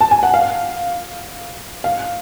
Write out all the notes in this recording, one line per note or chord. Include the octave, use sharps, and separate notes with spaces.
A5
G#5
F#5
F5
F5